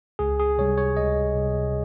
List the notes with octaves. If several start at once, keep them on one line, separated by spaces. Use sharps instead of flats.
C#2 G#4
G#4
C3 G3 C#5
C#5
C#2 D#5
C3 G3